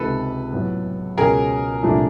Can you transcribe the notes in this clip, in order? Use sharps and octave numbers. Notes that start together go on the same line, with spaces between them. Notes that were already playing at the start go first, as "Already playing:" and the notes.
Already playing: C#2 C3 D#3 A4 B4
A2 F#3 B3
C#2 B2 G#3 C#4 G#4 A#4
C2 A#2 F3 A3 D4